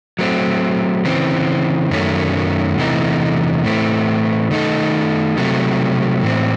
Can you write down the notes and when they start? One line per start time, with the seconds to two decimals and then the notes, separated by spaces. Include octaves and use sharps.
0.19 F#3 A3 C4
1.05 C#3 E3 C4
1.91 F#2 D#3 F#3 A3 C#4
2.78 E2 C3 E3 A3 D#4
3.64 A2 E3 A3 C4
4.51 D#3 A3 D#4 A4
5.37 C3 F#3 A3
6.23 A2 E3 C4